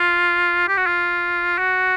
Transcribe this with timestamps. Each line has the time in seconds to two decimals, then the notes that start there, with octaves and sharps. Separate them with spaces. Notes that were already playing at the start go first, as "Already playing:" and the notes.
Already playing: F4
0.68 G4
0.77 F#4
0.86 F4
1.58 F#4